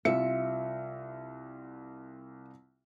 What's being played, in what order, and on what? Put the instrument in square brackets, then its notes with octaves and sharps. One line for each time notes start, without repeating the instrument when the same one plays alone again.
[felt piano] C2 F4 C#7 [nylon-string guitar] E5